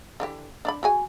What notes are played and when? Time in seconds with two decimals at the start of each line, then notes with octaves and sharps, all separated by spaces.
0.20 D3 E3 G4
0.65 D4 D5 B5
0.83 F#4 G#4 G#5